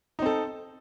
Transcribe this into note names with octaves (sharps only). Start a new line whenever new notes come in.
C4 D#4 A4